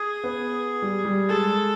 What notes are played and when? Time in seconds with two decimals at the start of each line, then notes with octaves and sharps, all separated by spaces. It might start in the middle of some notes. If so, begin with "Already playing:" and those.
Already playing: G#4
0.24 B3
0.82 G3
1.05 G3
1.29 G#3 A4